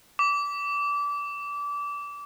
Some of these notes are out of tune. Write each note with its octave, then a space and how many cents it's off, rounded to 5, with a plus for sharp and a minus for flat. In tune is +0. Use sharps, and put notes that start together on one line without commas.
D6 -25